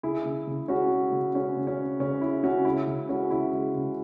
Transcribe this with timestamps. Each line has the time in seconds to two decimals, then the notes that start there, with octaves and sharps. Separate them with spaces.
0.03 C#3 E4 G#4
0.25 C#3
0.47 C#3
0.68 G#3 C#4 F#4
0.91 G#3
1.12 C#3
1.34 G#3 C#4
1.57 C#3
1.67 C#4
1.78 G#3
2.00 C#3 C#4
2.21 G#3 E4
2.43 C#3 C#4 F#4
2.65 G#3 E4
2.87 C#3
3.09 G#3 C#4 F#4
3.30 C#3 E4
3.53 G#3
3.75 C#3